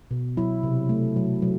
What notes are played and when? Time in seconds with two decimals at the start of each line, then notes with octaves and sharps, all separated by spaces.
0.11 B2
0.37 F#3 E4
0.63 C3
0.89 A3
1.16 F#3
1.42 F#3